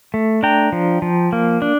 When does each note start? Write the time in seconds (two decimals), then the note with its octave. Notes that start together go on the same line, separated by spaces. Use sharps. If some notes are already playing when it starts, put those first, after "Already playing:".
0.14 A3
0.43 D4 G5 A#5
0.72 F3
1.02 F3
1.33 A#3
1.62 D4